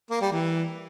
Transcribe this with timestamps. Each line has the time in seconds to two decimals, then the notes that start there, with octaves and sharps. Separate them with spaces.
0.11 A#3
0.21 G3
0.32 E3